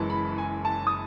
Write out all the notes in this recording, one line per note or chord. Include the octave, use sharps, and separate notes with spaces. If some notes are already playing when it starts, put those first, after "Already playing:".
Already playing: F#1 F#2 E3 G#3 A5
B5
G#5
A5
D#6